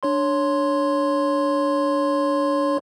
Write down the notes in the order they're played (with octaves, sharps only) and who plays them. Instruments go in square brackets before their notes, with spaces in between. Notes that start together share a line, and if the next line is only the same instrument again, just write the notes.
[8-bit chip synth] D4 C#5 C6